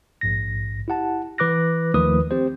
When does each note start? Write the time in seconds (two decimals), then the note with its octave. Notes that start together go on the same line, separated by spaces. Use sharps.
0.21 A#1 G#2 A#6
0.88 E4 G4 F#5 A5
1.38 E3 B4 D6 F#6 A#6
1.94 D#2 D#3 F3 A3 B4 D#6
2.31 C4 G4 C5